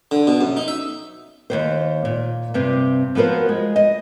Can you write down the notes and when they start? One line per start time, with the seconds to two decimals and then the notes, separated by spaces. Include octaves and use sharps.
0.11 D3
0.27 B2
0.41 F#2
0.57 D#4
0.68 E5
1.50 D#2 A#2 C5
2.05 A#2
2.54 G2 C3 C4
3.15 F3 B3 F#4 A#4 C5
3.49 G#3
3.76 D#5